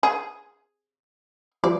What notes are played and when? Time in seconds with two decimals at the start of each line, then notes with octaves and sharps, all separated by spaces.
0.03 G#4
1.64 F3 G3 D5